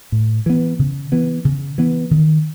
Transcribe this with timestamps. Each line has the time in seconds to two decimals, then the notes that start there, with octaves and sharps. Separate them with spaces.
0.12 A2
0.46 E3 B3
0.79 C#3
1.12 E3 B3
1.45 C#3
1.78 E3 B3
2.11 D#3